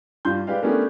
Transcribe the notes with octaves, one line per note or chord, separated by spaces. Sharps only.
G2 G3 F4 C6 G6
G#3 G4 B4 D5 F5
A3 B3 C#4 D4 G4 A#4